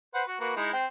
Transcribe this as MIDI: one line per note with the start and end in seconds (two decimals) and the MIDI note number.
0.14 0.22 71
0.14 0.22 72
0.14 0.22 78
0.27 0.38 66
0.40 0.55 58
0.40 0.55 66
0.40 0.55 71
0.56 0.71 56
0.56 0.71 63
0.56 0.71 64
0.73 0.86 60
0.73 0.86 79